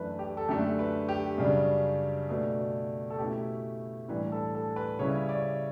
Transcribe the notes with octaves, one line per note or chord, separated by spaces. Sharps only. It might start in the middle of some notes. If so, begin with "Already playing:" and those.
Already playing: F#2 E3 A3 D4 A4 B4
G4
A4
F#2 D3 A3 D4 G4
B4
G4
F#2 C#3 G3 D4
B2 A3 D4
A4
B2 A3 C#4 E4 G4
A2 E3 G3 D4 B4
A4
A4
B4
C#3 G3 C#4 E4 C#5
D5